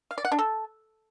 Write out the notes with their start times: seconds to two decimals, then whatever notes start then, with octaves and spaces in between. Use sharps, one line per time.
0.11 F5
0.18 D5
0.25 F#5
0.32 D4
0.39 A4